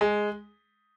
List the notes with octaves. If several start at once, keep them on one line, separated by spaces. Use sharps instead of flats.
G#3